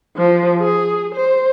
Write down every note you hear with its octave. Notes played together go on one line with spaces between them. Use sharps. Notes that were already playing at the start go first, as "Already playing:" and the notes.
F3
G#4
C5